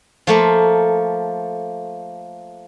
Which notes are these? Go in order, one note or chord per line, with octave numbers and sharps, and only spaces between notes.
F3 A3 A#3